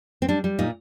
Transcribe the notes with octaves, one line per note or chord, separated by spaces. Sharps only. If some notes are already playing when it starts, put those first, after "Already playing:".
C4
G3 D4
G3
A#2 D#4